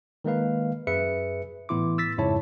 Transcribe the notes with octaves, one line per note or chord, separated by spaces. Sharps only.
D#3 G#3 A#3 B4 F5
F#2 G#4 B4 E5 C#7
A2 E3 B3 E4 C6 D6
E6 A6 B6
F2 G#2 C#3 E4 C#5 A5